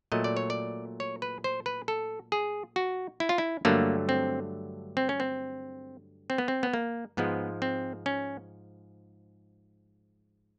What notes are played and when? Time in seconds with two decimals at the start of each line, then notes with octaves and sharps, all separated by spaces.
0.12 A#2 F#3 A3 D#5
0.24 D5
0.37 C#5
0.50 D5
1.00 C#5
1.22 B4
1.44 C5
1.66 B4
1.88 A4
2.32 G#4
2.76 F#4
3.20 E4
3.29 F4
3.38 E4
3.65 G2 D3 F#3 A3 A#3
4.09 C4
4.97 C4
5.09 C#4
5.20 C4
6.30 C4
6.38 B3
6.48 C4
6.63 B3
6.73 A#3
7.17 G#2 F3 G#3 B3
7.62 C4
8.06 C#4